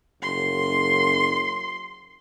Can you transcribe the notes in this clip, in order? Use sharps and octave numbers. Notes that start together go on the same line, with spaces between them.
F#1 C6